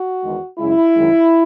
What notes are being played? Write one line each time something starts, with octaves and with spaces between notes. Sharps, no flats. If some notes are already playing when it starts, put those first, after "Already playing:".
Already playing: F#4
E2 D#3 G#3
F#2 C#3 G#3 E4
F#2 D#3 G#3